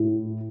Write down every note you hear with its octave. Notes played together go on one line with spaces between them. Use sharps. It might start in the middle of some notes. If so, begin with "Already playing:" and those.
Already playing: A2